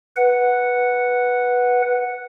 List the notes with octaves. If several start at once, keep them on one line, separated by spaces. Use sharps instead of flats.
B4 F#5